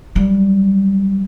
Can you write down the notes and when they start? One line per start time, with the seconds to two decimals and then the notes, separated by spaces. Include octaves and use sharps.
0.15 F#3 G3